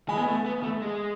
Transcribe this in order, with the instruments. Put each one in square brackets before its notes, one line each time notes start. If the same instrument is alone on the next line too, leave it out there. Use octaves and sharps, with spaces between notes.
[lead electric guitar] G#3 [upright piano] G#5 B5
[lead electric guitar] B3
A3
B3
A3
G#3